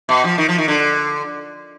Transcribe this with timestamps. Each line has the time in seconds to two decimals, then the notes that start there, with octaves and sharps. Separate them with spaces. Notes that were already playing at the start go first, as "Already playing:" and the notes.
0.09 B2
0.24 F3
0.38 D#3
0.49 F3
0.58 D#3
0.68 D3